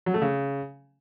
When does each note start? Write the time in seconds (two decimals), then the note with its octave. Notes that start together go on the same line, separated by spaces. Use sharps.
0.06 F#3
0.14 A3
0.22 C#3